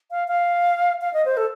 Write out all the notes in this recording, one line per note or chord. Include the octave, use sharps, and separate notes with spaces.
F5
F5
F5
D#5
C5
A4